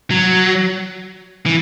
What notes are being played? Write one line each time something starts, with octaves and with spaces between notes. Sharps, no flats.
F#3
E3